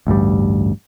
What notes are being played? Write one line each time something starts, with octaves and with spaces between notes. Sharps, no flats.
A1 D2 G2 G3